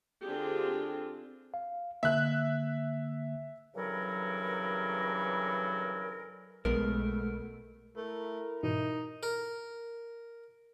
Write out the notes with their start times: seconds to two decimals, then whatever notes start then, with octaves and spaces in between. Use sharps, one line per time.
0.24 D3 C4 D4 F4 G4 G#4
1.54 F5
2.03 D3 A#3 E5 F#6
3.75 G2 C#3 E3 F#3 A4 A#4
6.65 B1 B2 G#3 A3 B3 A#4
7.96 A3 E4 A#4
8.63 G#2 B2 E3 D#4
9.23 A#4